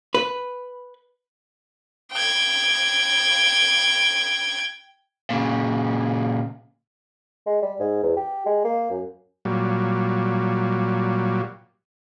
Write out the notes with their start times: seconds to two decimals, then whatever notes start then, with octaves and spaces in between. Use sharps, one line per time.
0.15 B4
2.13 G5 G#6
5.30 A#2 C#3
7.46 G#3
7.62 G3
7.80 G#2
8.03 E2
8.17 G4
8.46 G#3
8.64 A#3
8.91 F#2
9.45 A#2 F#3 G3